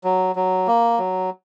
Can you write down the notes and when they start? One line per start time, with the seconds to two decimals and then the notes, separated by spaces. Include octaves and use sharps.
0.04 F#3
0.36 F#3
0.67 A#3
0.98 F#3